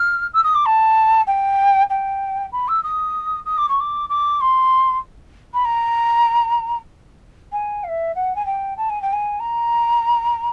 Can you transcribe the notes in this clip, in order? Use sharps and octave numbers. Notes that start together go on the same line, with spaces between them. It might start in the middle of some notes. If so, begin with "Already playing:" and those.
Already playing: F6
E6
D#6
D6
A5
G5
G5
B5
E6
D#6
D#6
D6
C#6
D6
D6
C6
B5
A#5
G#5
F5
E5
F#5
G#5
G5
A5
G#5
G5
G#5
A#5